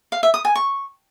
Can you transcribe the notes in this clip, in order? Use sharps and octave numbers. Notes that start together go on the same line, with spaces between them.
F5
E5
D#6
G#5
C#6